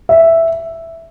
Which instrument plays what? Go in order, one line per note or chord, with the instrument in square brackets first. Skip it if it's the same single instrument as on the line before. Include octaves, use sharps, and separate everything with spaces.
[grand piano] E5